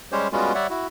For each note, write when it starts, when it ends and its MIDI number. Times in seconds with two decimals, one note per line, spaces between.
0.12 0.28 55
0.12 0.28 56
0.12 0.28 61
0.12 0.28 67
0.12 0.28 72
0.12 0.28 73
0.33 0.53 55
0.33 0.53 56
0.33 0.53 59
0.33 0.53 61
0.33 0.53 65
0.33 0.53 66
0.55 0.67 55
0.55 0.67 73
0.55 0.67 74
0.55 0.67 76
0.55 0.67 78
0.70 0.87 64
0.70 0.87 66